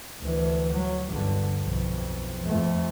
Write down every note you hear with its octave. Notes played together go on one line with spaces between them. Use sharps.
D2 E3
F#3
G1 D3
B1 F2
F2 A3